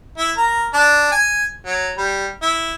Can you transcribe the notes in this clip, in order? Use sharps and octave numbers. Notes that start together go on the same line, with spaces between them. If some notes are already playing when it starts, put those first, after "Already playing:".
E4
A#4
D4
G#5
F#3
G3
E4